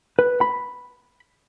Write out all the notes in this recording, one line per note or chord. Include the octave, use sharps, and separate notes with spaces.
B4
B5